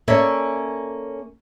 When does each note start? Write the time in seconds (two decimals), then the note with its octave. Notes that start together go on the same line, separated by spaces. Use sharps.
0.08 A#3 C#4 A4 C#5 D5 E5